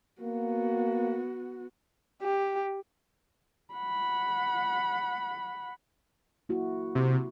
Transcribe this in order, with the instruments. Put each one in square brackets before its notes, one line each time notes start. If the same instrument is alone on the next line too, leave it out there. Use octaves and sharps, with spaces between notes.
[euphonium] A#3 [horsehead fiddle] B3 F#4
[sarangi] G4
[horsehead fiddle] F#5 B5
[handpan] A#3 E4 F#4
[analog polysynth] C3